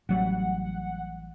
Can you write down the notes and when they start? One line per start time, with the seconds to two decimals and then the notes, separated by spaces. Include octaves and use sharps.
0.09 A1 F#3 G3 F#5